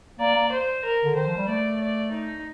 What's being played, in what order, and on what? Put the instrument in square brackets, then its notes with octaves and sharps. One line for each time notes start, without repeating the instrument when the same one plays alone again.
[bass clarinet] A#3 [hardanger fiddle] D5
[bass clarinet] A#3
[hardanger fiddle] C5
A#4
[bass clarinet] D3
[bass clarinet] D#3 [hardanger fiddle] C5
[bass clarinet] F3
G3
[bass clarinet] A3 [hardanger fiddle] D5
[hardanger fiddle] D5
D#4